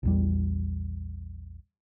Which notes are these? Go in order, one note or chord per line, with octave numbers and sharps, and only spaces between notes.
A#1 E2 G3